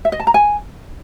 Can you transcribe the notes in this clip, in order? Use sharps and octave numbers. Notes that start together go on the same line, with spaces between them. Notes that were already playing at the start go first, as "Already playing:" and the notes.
E5
D#5
A5
A#5
G#5